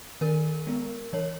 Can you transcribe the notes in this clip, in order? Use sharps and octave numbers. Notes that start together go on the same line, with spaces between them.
D#3 A#4
G#3 B3
E3 C#5